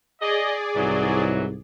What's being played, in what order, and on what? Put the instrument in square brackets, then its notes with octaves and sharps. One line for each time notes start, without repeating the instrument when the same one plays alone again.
[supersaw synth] G#4 D5 [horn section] D#5
[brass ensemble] C2 G#2 [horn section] E3 F#3